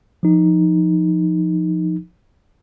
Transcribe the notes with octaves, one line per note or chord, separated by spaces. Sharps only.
F3 D#4